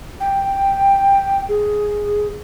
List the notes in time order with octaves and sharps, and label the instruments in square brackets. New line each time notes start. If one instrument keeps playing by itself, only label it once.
[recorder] G5
G#4